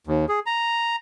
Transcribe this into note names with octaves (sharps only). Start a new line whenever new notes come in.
D#2
G#4
A#5